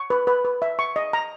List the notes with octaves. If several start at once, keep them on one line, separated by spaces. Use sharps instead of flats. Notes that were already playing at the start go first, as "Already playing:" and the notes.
Already playing: C#6
B4
B4
B4
E5
C#6
D#5
A#5